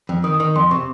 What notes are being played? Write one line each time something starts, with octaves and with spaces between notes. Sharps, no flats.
F2
D#3 D#6
D#6
D#3
F2 C6
C3 C#6